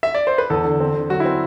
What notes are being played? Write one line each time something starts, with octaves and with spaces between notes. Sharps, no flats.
E5
D5
C5
B4
E2 A4
D3
C4
D3
F#3 F#4
E4
C4